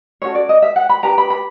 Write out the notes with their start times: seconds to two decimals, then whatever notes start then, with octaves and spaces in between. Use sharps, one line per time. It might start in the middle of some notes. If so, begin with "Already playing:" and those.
0.22 C#4 F#4 A4 C#5
0.35 D5
0.49 D#5
0.62 E5
0.76 F#5
0.89 B5
1.03 D4 G4 B4 A#5
1.18 B5
1.30 B5